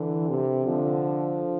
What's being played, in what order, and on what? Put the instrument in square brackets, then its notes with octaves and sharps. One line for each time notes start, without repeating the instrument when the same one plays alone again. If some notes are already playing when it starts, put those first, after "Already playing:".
Already playing: [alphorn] D3 [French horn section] E3
[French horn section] C3
[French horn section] D3 [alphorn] F3